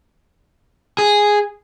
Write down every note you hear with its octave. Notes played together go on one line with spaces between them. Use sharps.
G#4